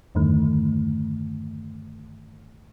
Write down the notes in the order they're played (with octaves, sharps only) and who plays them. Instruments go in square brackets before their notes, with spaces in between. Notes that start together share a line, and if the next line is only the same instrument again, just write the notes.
[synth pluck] E2 G2 D3 D#3 A3